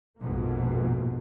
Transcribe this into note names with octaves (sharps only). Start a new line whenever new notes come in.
A#1 F2 G#2 B2 A#3